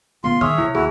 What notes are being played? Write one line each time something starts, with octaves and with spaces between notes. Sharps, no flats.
C#3 B3 F4 C6
D#3 G#4 C#5 E5 F6
C3 F3 E4
D#2 E4 F#4 G#4